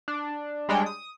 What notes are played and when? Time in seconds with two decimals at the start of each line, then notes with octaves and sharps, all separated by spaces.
0.08 D4
0.69 G3 G#3 D4 C#5 G5
0.86 D#6